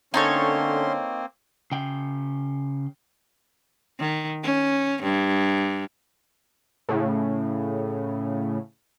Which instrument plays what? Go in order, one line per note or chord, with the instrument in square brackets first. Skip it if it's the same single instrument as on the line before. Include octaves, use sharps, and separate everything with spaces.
[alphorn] D3 [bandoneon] A#3 C4 [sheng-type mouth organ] C#4 C6 [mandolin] D#4 A4 C#5
[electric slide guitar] C#3 G5
[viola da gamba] D#3
C#4
G2
[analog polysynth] A2 C#3